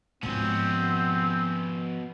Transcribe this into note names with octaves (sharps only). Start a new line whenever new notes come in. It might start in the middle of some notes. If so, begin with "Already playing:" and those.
G#2 B2 F3 C4 C#4